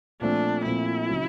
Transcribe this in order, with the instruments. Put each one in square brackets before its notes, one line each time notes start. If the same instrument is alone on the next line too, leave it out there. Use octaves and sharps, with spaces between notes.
[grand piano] A#2 F3 A3 C4 [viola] D4
[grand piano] A#2 F3 A3 C4 [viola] E4
[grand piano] C#3 F#3